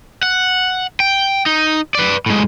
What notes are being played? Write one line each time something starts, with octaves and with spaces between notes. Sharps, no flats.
F#5
G5
D#4
B4 D5
A2 G#3